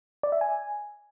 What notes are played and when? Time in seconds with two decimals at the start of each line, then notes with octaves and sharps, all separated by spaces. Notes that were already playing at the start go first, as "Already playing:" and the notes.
0.23 D5
0.32 E5
0.41 G#5